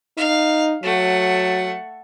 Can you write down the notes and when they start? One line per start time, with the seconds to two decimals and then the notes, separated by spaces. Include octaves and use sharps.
0.18 D#4 F5
0.83 F#3 A3 F#5